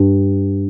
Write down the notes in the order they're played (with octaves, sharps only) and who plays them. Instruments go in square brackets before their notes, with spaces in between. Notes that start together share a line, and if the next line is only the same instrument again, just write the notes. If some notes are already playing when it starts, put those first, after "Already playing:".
Already playing: [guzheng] G2